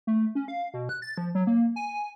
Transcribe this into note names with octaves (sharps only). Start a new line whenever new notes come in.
A3
C#4
F5
B2
F#6
A6
F3
F#3
A#3
G#5